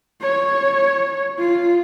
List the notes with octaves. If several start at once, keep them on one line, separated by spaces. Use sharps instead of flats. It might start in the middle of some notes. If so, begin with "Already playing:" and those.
C#5
F4